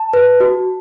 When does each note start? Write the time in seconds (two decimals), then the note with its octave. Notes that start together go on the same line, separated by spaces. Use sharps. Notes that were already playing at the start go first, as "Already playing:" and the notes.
Already playing: A5
0.13 B4
0.40 F#4